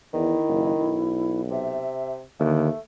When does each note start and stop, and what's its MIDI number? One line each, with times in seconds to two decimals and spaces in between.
0.14 0.36 40
0.14 1.09 51
0.14 1.42 64
0.48 0.72 30
0.81 1.92 35
1.50 2.23 48
1.50 2.17 76
2.40 2.69 39
2.40 2.69 50
2.40 2.79 57